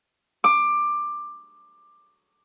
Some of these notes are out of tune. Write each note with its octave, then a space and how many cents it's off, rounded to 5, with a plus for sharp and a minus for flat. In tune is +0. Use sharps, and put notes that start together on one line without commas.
D6 +15